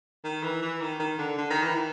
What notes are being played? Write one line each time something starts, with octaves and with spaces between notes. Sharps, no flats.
D#3
E3
E3
D#3
D#3
D3
D3
D#3
E3
D#3